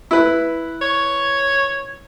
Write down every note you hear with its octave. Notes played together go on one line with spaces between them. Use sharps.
E4 B4
C#5